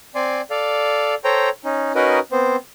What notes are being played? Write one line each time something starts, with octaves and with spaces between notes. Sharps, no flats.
C4 D5 G#5 C6
A4 D5 F5
A4 C5 C#5 G5 A#5
C#4 D#4
C#4 D#4 F#4 A#4 B4 D#5
B3 C4 C5